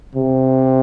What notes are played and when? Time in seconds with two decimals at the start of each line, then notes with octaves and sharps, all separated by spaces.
0.15 C3